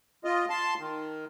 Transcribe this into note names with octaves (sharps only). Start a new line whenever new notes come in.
F4 D#5
A5 C6
D#3